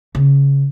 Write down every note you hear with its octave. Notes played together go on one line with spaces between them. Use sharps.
C#3